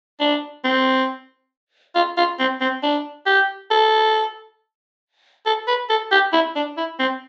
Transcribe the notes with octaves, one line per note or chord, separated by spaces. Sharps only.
D4
C4
F4
F4
C4
C4
D4
G4
A4
A4
B4
A4
G4
E4
D4
E4
C4